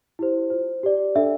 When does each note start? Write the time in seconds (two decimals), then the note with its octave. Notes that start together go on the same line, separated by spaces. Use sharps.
0.19 E4 G4 C5
0.50 F4 C5
0.83 G4 D5
1.15 D4 A4 D5 E5